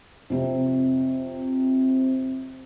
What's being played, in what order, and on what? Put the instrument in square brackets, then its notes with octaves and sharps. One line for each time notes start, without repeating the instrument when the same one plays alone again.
[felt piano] F2 C3